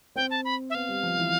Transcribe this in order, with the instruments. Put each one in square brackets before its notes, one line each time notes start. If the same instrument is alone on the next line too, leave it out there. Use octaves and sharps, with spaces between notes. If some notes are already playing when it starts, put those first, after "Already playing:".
[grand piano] C4 [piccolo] G5
[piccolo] A5
B5
E5
[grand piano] B3 [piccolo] F5
[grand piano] G3
F3
E3